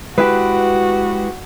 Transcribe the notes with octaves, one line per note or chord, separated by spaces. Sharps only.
G#3 E4 F#4 G4 B4